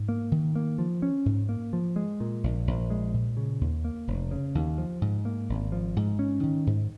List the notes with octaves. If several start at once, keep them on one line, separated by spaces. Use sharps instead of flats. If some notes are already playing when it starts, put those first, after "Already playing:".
Already playing: G#2
A#3
D#3
A#3
F3
C#4
G#2
A#3
F3
G#3
A#2
A#1
A#1
G#3
A#2
C#3
D#2
A#3
F1
C#3
D#2
F3
G#2
A#3
G#1
F3
G#2
C#4
D#3
G#2